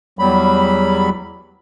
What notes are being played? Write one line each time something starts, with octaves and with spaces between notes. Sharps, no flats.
E2 F#3 G3 B5